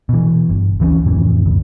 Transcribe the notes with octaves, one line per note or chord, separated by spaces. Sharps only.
B2 E3
G1
D2 E3 F#3 C#4
F2 A2 C3 E3
G1 D2